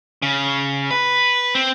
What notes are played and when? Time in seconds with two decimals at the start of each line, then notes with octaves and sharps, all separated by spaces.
0.22 C#3
0.91 B4
1.55 C4